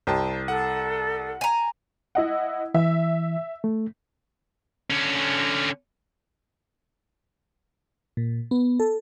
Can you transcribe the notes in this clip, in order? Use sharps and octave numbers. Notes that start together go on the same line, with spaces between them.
C2 C5 G5 A5
A4 F#5
G#5 A#5
E4 D#5 F#5
E3 E5
A3
D3 C#4
A#2
B3
A4